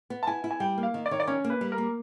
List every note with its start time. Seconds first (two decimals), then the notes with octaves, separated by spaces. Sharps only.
0.10 B3
0.23 A5
0.27 E4 G#5
0.44 E4
0.51 G#5
0.60 G3 G5
0.78 A#3
0.83 F5
0.94 D#3
1.06 D5
1.11 D#3 C#5
1.20 D5
1.27 C#4 C#5
1.44 A#3
1.50 B4
1.61 G3
1.72 A#4
1.78 A#3